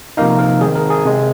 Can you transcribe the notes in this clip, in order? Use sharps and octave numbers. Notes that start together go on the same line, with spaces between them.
C3 F3 A#3 D#4 F5
A#4
D#3 G#3 C4 G#4
A#4
G#4
C3 G#3 C4